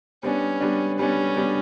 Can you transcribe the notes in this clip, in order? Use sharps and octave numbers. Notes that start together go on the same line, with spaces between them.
G3 B3 C#4 D4
G3 B3 D4
G3 B3 C#4 D4
G3 B3 D4